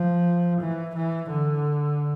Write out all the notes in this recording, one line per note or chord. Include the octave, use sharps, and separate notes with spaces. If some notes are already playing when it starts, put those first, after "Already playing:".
Already playing: F3
E3
E3
D3